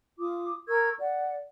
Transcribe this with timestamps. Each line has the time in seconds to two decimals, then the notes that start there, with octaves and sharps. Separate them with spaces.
0.19 F4 D6 D#6
0.68 A#4 C#6 E6 G#6
1.00 D5 F#5